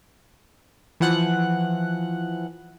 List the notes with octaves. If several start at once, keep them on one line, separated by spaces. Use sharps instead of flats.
E3 F3 F#5 F#6